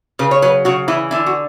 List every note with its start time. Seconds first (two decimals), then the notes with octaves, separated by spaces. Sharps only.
0.19 C#3 B4
0.31 C#5
0.42 F#3 B4
0.65 C#3 F#4
0.88 E3 E4
1.11 D3 E4
1.26 F#4